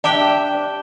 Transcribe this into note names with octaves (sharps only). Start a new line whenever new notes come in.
D4 G4 E5 G5